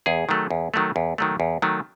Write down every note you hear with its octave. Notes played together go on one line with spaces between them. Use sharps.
E2 G#4
D#3 F#3 A3
E2
D#3 F#3 A3
E2
D#3 F#3 A3
E2
D#3 F#3 A3